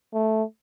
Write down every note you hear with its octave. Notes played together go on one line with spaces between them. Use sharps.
A3